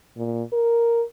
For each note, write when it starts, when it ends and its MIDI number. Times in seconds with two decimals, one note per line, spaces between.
0.17 0.43 46
0.53 1.03 70